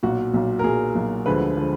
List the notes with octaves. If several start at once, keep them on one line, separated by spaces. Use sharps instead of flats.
B1 A#2 F#3 F#4
B1 A#2 F#3
A#4
B1 A#2 F#3 G#4
B1 A#2 F#3
D2 D3 F3 G#3 B4
D3 F3 G#3